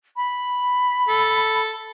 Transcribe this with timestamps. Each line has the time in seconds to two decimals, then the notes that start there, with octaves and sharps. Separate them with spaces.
0.16 B5
1.09 A4